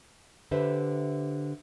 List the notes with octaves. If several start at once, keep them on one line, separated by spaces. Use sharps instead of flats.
D3 G4 B4 C5 E5